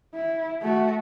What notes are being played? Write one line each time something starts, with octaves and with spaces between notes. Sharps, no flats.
E4
A3 F#4